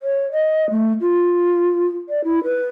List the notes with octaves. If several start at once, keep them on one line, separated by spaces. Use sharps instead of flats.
C#5
D#5
A3
F4
D5
E4
B4